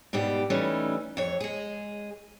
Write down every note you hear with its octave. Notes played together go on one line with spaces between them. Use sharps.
G#2 B2 G3 G4
E3 G3 A3 C#4 D#4
F2 C#5
G#3 G#4